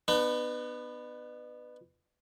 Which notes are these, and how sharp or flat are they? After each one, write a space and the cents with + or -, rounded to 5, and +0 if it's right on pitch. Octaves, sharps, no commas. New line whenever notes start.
B3 +5 D#4 -45